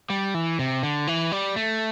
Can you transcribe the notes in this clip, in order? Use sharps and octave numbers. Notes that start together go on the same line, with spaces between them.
G3
E3
C3
D3
E3
G3
A3